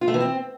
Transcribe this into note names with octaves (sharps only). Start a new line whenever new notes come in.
F4
A3
E3
C4